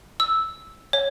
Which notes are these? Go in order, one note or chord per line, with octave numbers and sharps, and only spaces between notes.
E6
C#5